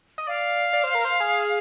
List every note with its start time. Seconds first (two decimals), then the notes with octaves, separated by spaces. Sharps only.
0.18 D#5
0.27 D5 F5
0.73 D5
0.84 C5
0.95 A#4
1.05 C5
1.20 G#4